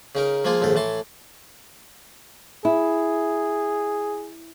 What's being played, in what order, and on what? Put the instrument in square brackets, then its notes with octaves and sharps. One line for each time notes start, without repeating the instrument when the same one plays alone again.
[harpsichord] C#3 D#4 A#4
F3 G#3 A#3 F4
A#1 D#2 G#2 A4
A2 E3 A5 C6
[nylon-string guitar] E4 [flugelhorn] G#4